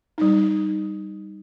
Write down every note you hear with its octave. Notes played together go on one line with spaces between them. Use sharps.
G3 D#4